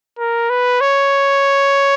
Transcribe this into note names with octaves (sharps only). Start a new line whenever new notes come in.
A#4
B4
C#5